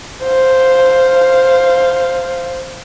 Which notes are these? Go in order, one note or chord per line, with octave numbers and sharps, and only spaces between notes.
C5 F5